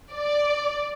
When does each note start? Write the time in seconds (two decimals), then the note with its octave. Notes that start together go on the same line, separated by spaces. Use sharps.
0.12 D5